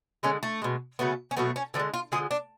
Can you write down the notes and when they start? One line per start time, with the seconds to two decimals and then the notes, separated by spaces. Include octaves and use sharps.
0.23 D3 G#3 C#4
0.43 A3
0.62 B2 G#3
0.99 C#3 F#3 A3 B3
1.31 C#4
1.37 B2 F#3 A3 B3
1.56 C#4
1.74 D3 F3 D4
1.79 G#3
1.94 F4
2.12 D3 F3 G#3 G#4
2.31 D4